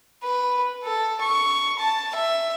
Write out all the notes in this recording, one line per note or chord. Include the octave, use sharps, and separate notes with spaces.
B4
A4
C#6
A5
E5